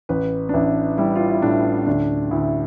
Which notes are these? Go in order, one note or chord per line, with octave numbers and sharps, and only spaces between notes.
A1 B4
D4
A1 E4
G3 E4
F4
E4
A2 D4
D2 D4
D2 E4